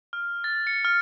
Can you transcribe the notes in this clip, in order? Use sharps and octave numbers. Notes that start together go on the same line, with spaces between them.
F6
A6
C#7
F6